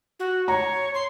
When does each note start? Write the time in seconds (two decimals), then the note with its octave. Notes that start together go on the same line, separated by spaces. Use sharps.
0.20 F#4
0.48 C#5 A#5
0.94 C6